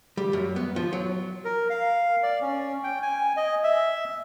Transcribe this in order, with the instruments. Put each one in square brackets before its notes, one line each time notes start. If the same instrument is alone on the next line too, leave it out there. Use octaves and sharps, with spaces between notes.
[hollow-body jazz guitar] G3
F#2
B3
F3
F#3
[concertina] A#4
F5
D5
C#4
G5
G#5
D#5
E5